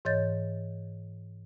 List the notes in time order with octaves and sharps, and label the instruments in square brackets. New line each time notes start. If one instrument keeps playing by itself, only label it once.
[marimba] G#2 E3 C#5 D#5 G6 A6